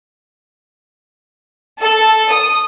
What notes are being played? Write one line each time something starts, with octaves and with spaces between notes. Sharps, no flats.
A4
D#6